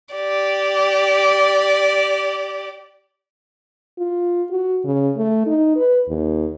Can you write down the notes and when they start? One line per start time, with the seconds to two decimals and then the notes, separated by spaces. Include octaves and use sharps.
0.15 G4 D5
3.98 F4
4.51 F#4
4.85 C#3
5.17 A3
5.46 D#4
5.77 B4
6.09 D#2